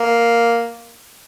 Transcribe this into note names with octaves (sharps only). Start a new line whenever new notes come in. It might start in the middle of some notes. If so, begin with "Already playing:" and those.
Already playing: A#3